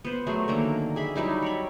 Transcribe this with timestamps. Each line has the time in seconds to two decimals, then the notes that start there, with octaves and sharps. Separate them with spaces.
0.04 B3 C5
0.27 F#3 A3 G#4
0.48 D3 D#3 A#3 A#5
0.96 G#4 E5 B5
1.16 F#3 G3 D#4 E4
1.42 C#5 D5 B5